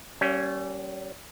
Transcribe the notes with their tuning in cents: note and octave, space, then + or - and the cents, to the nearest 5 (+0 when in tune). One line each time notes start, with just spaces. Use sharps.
G3 -35 A#3 +0 C#4 +0